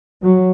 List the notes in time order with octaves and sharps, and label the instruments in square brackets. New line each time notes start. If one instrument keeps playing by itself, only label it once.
[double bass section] F#3